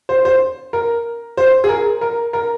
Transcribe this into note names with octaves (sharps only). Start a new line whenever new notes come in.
C5
C5
A#4
C5
G#4
A#4
A#4
A#4